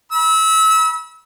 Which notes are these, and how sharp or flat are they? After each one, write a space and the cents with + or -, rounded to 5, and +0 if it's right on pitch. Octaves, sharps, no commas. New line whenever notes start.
B5 -35 E6 -30